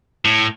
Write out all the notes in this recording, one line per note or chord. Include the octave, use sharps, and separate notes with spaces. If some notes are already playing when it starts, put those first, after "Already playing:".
A2